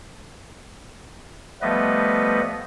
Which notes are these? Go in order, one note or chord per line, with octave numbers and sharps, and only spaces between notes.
F3 G3 A3 B3 B4 D#5